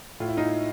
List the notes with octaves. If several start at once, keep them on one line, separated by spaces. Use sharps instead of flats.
A2 F4
E4
D#4 F4